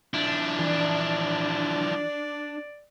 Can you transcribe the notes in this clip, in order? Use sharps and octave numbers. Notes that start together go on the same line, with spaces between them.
F3 D4 E4
E3 D5